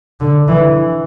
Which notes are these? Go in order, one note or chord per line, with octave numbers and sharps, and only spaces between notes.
D3
E3